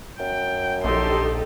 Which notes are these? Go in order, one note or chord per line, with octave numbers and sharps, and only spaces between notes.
F#2 G5
A#1 D#4 G4 A4 C6